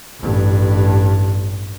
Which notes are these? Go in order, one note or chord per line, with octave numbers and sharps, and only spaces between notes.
A1 G2